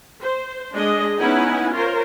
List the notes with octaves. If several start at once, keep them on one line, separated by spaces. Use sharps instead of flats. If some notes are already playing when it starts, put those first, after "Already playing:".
C5
G#3 D4 G#4 D#5
B3 C#4 D#4 E4 F#5 G#5
F4 A#4 C5 C#5